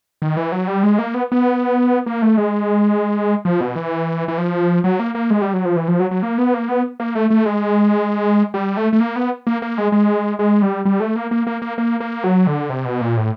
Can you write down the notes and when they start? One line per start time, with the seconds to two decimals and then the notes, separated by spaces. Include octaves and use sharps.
0.22 D#3
0.37 E3
0.52 F#3
0.68 G3
0.83 G#3
0.99 A#3
1.14 B3
1.32 B3
2.06 A#3
2.22 A3
2.37 G#3
3.45 F3
3.61 B2
3.76 E3
4.28 E3
4.38 F3
4.84 F#3
5.00 A#3
5.15 A#3
5.30 G#3
5.42 G3
5.53 F#3
5.65 F3
5.76 E3
5.88 F3
6.00 F#3
6.11 F#3
6.23 A#3
6.38 B3
6.54 A#3
6.69 B3
7.00 A#3
7.15 A3
7.30 A3
7.46 G#3
8.54 G3
8.77 A3
8.93 A3
9.00 A#3
9.16 B3
9.47 A#3
9.62 A#3
9.78 G#3
9.92 G#3
10.39 G#3
10.62 G3
10.85 G3
11.00 A3
11.16 A#3
11.31 A#3
11.47 A#3
11.62 A#3
11.78 A#3
12.00 A#3
12.24 F#3
12.47 D3
12.70 C3
12.85 B2
13.01 A#2
13.17 A2